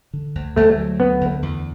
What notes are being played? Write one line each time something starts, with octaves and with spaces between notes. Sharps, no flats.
D3
D2
D2 A3
F#3
D3 B3
D2
E2